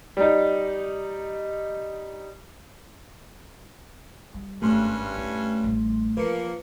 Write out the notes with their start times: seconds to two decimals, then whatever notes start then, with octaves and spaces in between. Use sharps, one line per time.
0.17 G3 D#4
4.34 G3
4.62 G#1 G2 A3 C#4 C6
5.17 E4
5.64 A1 G3
6.17 E3 F3 A#3 B4 C#7